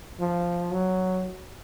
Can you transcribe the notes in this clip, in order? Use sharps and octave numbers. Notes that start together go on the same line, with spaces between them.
F3
F#3